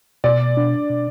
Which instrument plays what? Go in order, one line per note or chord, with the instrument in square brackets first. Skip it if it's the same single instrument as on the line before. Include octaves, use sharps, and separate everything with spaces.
[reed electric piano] B2 [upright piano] D5
[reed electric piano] D4
B2